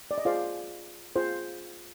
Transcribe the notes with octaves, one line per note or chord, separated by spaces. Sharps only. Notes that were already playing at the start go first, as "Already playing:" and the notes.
D5
D#5
F4 G#4 C5 D5 F5
F4 G#4 C5